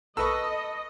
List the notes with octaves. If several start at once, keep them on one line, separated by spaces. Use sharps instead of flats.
A4 B4 D#5 C#6 E6